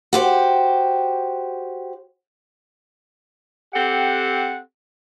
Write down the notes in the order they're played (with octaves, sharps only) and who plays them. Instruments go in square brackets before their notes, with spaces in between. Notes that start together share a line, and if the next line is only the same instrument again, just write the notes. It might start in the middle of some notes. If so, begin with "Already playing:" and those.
[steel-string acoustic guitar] F#4 G4 C5
[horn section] C4 G4 A4 F#5